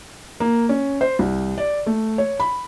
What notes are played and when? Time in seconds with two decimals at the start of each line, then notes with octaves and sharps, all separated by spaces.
0.40 A#3
0.69 C#4
1.01 C5
1.19 C2
1.58 D5
1.86 A3
2.18 C#5
2.40 B5